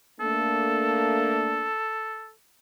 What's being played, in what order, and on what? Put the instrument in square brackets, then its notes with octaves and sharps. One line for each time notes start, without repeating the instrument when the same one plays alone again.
[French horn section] A3 A#3 D4 [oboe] A4